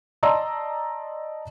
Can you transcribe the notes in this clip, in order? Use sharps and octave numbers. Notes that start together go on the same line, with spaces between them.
D5 D#5 A5 A#5 C6 E6